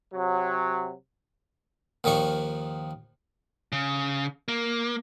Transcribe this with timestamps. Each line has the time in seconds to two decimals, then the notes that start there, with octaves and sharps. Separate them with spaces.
0.14 C3 F#3
2.04 D#2 D#3 F3 D5 C#6
3.72 C#3
4.48 A#3